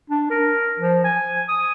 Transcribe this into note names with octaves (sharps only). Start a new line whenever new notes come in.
D4
A#4
F3
G#5
D#6